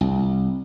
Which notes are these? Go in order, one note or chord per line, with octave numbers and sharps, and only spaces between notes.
C2